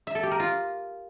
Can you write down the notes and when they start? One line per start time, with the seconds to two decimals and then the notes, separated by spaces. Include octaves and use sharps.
0.07 E5
0.15 A4
0.23 G4
0.31 A#4
0.40 F4